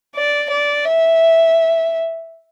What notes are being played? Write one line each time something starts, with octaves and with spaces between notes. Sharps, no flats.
D5
D5
E5